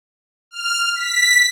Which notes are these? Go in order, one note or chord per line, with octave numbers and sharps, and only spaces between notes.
F6
B6